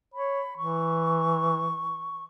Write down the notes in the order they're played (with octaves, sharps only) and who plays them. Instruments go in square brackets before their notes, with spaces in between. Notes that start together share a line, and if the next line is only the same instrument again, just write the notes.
[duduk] C#5 [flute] B5
[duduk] E3 [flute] C#6